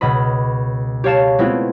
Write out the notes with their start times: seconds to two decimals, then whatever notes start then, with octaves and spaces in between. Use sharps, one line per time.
0.01 C#2 B2 D#5 B5
1.04 G4 C#5 F5 A5 E7
1.39 G#3 A3 B3 C4 E4 F4